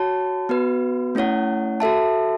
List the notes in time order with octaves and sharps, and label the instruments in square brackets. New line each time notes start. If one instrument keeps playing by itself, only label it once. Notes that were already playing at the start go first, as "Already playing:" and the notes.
Already playing: [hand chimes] F#4 C#5 A5
B3 F#4 B4
A3 C#4 E4 C#5 F#5
F#4 A4 E5 A5